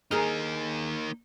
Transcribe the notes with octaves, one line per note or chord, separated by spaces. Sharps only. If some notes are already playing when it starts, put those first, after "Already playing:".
A#3 D#4 G#4 A#4